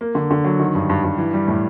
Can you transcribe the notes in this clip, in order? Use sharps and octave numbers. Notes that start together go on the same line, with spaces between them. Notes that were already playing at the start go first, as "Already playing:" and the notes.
A#3
D3
D3
F#3
D#3
G2
G2
G2
E3
G3
A2